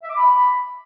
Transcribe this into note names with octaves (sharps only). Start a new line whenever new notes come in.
E5
D6
B5